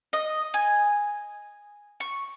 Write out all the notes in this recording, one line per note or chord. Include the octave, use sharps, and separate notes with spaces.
D#5
G#5
C#6